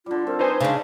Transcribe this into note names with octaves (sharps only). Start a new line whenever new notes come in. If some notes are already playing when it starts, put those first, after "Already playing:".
D3 G3 F4
C4 A#4
D#4 B4 C5 G#5 B5
C#3 D4